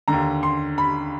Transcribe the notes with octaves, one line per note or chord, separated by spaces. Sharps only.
D#2 D3 A#5
C6
B5